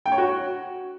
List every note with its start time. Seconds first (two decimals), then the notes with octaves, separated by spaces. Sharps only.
0.06 G5
0.12 C#5
0.18 F#4